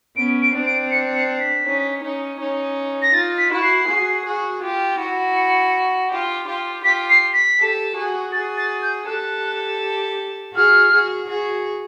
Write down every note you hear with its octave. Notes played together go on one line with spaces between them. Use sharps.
B3 C#4 D7
D7
C4 D4
D7
C#7
C#7
B6
C#4 D#4
C#4 D#4
C#4 D#4
A#6
D#4 F4 A6
B6
E4 F#4
C7
F#4 G#4
F#4 G#4
F4 G4
E4 F#4
C#7
F4 G4
F4 G4
F4 G4 B6
C7
B6
G4 A4
F#4 G#4
F#4 G#4 A6
A6
G6
G4 A4 F#6
F#4 G#4 F6
F#4 G#4
F#4 G#4